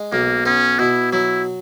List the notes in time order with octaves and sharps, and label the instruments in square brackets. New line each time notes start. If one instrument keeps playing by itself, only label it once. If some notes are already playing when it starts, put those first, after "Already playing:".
Already playing: [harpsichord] G#3
[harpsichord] B1 [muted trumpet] A#3
[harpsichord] B3 [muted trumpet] C#4
[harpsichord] B2 [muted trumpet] E4
[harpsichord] F#3 [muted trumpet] E4